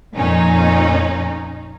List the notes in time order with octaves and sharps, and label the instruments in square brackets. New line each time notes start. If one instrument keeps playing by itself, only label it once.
[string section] F2 A#2 C#4 D#4